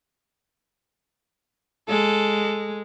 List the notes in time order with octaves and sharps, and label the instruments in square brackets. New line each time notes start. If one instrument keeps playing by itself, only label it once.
[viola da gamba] G#3 [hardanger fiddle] A4